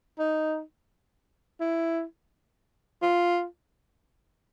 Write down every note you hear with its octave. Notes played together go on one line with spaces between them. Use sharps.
D#4
E4
F4